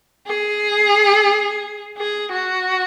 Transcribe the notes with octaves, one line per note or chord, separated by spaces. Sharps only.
G#4
G#4
F#4